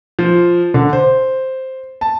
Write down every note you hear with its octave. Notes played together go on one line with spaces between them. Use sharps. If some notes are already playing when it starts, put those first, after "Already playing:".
F3
D3
C5
A5